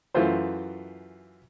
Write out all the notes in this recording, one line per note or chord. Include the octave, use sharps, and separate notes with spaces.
F#2 E3 A3 F4 C5